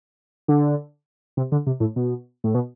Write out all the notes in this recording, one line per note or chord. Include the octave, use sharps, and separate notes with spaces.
D3
C3
D3
C3
A2
B2
A2
B2